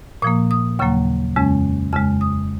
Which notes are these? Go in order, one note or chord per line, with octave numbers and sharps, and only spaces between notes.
A#2 F3 A#3 D#6
D#6
D#2 C#3 F#3 A#3 C#6
F2 C#3 G#3 C#4
F2 C#3 G#3 F6
D#6